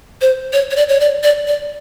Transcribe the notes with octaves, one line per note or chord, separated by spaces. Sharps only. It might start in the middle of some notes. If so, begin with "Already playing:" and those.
C5
C#5
C#5
D5
C#5
D5
D5
D5